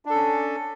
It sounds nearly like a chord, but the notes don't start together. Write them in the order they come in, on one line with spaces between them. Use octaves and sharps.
D4 A4 C#4